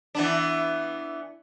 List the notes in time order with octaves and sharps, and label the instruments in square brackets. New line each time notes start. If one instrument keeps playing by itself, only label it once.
[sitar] E3 B3 D4